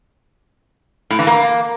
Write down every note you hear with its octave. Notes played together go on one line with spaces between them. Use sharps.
A2
E3
A#3